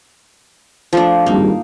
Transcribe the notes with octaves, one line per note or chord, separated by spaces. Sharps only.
F3 A3 D4
G#1 G2 A#3 D#4